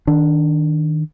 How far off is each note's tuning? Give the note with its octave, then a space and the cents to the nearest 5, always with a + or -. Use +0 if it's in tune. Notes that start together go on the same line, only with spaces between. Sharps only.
D#3 +5 D4 +0